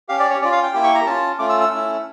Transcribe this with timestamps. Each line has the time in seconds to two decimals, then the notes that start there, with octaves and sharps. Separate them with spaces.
0.09 C#4 G4 F5
0.19 D5
0.30 C#5
0.41 C#4 D5
0.44 F4
0.52 F5
0.63 G5
0.74 A#3 E4 G4
0.84 C#6
0.95 A#5
1.06 C#4 F4 A5
1.39 A3 C#4 F4 D6
1.49 E6
1.60 E6
1.71 A3 C#4 E4